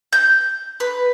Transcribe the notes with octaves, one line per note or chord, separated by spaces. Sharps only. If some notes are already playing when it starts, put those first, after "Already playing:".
G6
B4